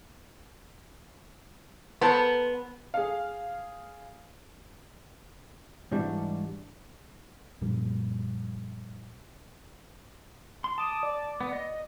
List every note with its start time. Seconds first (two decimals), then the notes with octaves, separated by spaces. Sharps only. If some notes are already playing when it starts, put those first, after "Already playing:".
2.01 B3 A4 A#4 C5
2.94 G#4 F5
5.91 G#2 E3 G3 D4 F#4
7.61 F#2 A#2 F3 G3
10.64 C6
10.78 A5 D6 D#6
11.03 D5
11.41 B3
11.53 D#5